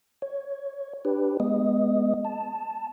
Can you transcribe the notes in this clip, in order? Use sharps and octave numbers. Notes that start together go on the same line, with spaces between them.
C#5
D4 G4 B4
G#3 B3 D#5
A5